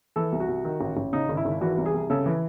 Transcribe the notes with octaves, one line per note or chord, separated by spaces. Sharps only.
E3 A4
C2
F#4
C2
D#3
A1
A1
C#3 D#4
G#1
E4
G#1
E3 F#4
C2
G#4
C2
C#3 A4
E3